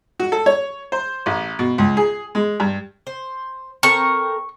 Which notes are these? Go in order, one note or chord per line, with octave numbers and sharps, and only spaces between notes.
F#4
A4
C#5
C5
A1
B2
C#2
G#4
G#3
G2
C5
C4 A4 A#4 C#6